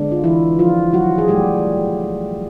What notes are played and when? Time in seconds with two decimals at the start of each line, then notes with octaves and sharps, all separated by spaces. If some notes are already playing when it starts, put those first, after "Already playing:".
Already playing: D3 G#3 B3 D4
0.12 F4
0.24 E3 E4
0.59 F3 F4
0.93 F#3 F#4
1.18 G#4
1.28 A#2 F#3 G3 A3 G4